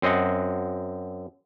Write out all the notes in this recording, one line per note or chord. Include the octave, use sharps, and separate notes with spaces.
F#2 C4 D#5 F#5